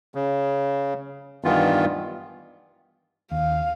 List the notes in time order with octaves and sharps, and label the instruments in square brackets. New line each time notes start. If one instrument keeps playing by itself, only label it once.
[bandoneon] C#3
G2 D#3 E3 B3 F4
[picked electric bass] D#2 [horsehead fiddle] F5